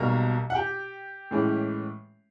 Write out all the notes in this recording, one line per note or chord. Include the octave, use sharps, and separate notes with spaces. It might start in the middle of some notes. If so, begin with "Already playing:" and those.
Already playing: B1 B2 G3 A#3 A#4 A#5
F#5
G4 G5
A2 E3 G#3 C#4